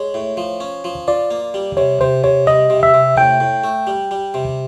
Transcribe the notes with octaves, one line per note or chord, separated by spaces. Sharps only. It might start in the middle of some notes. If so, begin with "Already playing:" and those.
Already playing: G#3 C#5
A2
F3
C#4
F3
F4 D5
A#3
G3
C3 C#5
C3 C5
C3 C#5
G3 D#5
C3
E5
C3
A2 G5
A2
A3
G3
G3
C3